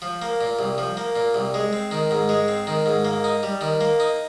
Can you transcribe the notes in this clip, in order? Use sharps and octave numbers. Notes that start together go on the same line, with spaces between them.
F3
A#3
A#2
C2
F3
A#3
A#2
C2
G#3
C4
D#3
G#2
G#3
C4
D#3
G#2
A#3
D#4
G3
D#3
A#3
D#4